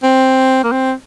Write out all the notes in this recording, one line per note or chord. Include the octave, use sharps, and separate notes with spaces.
C4
A#3
C4